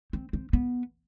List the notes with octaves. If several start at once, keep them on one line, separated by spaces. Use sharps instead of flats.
C4
C4
B3